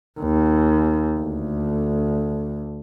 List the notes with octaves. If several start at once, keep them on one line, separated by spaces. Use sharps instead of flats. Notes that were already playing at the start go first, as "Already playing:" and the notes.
D#2
D2